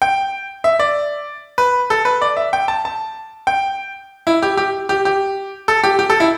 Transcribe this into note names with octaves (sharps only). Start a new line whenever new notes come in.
G5
E5
D5
B4
A4
B4
D5
E5
G5
A5
A5
G5
E4
G4
G4
G4
G4
A4
G4
G4
A4
E4